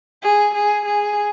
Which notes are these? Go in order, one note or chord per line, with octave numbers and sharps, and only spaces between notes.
G#4
G#4
G#4